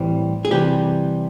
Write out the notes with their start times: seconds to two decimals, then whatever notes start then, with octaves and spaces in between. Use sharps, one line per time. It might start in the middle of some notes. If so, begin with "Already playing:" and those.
Already playing: A2 E3 G3 C4
0.45 G#4
0.51 C3 E3 G3 G4